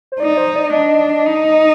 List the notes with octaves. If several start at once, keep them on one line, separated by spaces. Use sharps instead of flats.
C5
D#4 D5
C5
D5
D4 D#5
D#4